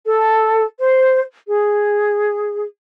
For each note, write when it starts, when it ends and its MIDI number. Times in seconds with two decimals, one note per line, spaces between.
0.05 0.64 69
0.78 1.22 72
1.48 2.64 68